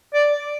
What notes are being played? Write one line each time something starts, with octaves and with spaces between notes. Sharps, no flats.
D5